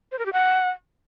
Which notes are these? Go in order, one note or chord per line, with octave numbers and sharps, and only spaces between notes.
C5
A#4
G4
F#5